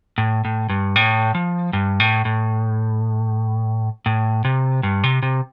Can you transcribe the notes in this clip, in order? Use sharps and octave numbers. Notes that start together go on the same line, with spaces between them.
A2
A2
G2
A2
F3
G2
A2
A2
A2
C3
G2
C3
C3